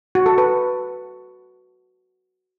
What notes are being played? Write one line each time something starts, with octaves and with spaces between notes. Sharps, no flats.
F#4
A4
B4